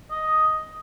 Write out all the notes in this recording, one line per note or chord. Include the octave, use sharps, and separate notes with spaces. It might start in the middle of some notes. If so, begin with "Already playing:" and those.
D#5